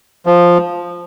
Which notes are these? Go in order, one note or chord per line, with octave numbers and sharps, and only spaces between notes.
F3